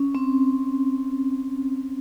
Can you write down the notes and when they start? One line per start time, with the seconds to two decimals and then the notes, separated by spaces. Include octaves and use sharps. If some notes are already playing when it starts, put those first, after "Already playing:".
Already playing: C#4
0.15 C4